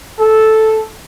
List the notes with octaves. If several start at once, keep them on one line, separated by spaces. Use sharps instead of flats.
A4